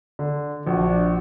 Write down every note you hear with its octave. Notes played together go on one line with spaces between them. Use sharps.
D3
A#1 D4 F#4